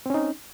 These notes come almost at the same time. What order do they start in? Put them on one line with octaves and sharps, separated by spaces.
C4 C#4 D#4